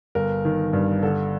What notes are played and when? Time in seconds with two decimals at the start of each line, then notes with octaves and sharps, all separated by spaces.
0.15 G1 A#4
0.45 D#3
0.73 G2
1.03 D3 A4